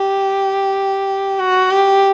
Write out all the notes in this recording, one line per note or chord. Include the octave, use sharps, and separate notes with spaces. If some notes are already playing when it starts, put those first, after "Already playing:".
Already playing: G4
F#4
G4